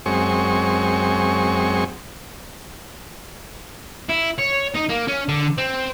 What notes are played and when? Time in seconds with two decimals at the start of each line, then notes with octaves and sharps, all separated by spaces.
0.06 F#2 G#3 C4 C#6
4.09 E4
4.38 C#5
4.74 D#4
4.89 A#3
5.08 C#4
5.28 D3
5.58 C4